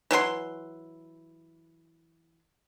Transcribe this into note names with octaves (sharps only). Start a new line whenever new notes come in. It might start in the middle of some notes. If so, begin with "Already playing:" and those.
E3 F#3 G#4 C6